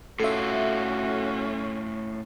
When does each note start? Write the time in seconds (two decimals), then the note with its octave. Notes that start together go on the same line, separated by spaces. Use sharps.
0.20 A2 C#4 F4 F#4 A4 E5